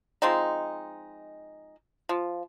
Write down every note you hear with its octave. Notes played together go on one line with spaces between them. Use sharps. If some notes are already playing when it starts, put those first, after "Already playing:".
F3 G#3 C4 D#4
F3